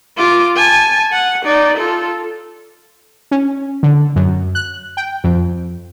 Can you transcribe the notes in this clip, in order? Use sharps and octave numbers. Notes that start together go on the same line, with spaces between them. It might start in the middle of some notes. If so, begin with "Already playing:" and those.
F4 D6
G#5 A5
F#5
D#4 D5
F4 A4
C#4
D3
F#2
F#6
G5
F2